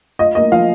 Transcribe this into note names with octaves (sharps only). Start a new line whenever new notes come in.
F4 D#5
A#3 D#5
F3 F5